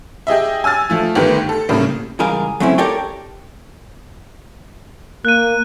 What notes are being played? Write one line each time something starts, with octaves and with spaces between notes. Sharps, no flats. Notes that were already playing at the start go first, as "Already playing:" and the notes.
G4 G#4 D#5 E5
G#5 E6 F6 A6
F3 A3 F4
G1 D#3 A3 G4 B4
A4
A2 C#3 G3 A#3
C#2 E3 G3 G#4 A#4 F5
F#3 A3 C4 C#4 E4
G4 A4 A#4 C#5 D5 G5
A#3 F#6 D#7